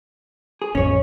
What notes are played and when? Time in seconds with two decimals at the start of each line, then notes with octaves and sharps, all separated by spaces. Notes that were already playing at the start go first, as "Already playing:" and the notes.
0.62 G#4
0.75 A1 F2 C#4 C#5